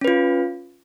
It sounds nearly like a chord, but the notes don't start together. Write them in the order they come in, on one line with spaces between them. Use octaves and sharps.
C#4 B4 F4